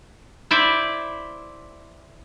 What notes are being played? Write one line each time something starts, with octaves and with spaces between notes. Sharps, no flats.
E4 C5 D5 E5